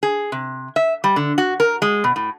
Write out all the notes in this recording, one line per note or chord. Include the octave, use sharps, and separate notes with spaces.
G#4
C3
E5
G3
D3
F#4
A#4
G#3
B2
A2